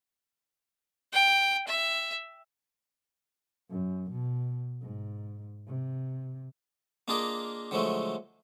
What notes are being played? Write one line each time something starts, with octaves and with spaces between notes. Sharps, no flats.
G5
E5
F#2
B2
G#2
C3
A#3 D4 F4 G#4 A#4 D#5
D3 F3 F#3 G#3 A3